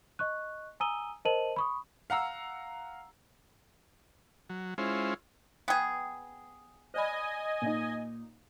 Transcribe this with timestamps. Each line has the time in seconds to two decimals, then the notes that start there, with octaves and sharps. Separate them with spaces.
0.19 D#5 C#6 F#6
0.80 G#5 A#5 D#6 E6 D#7 G7
1.25 A#4 C5 D#5 A5 D#7 F#7
1.56 B5 C#6 D#6
2.10 F5 F#5 A#5 E6
4.50 F#3
4.78 G#3 C#4 E4 F4 C5
5.68 B3 G#4 B4 G5 C#6
6.94 C5 D5 D#5 G#5 B5
7.62 A#2 D#4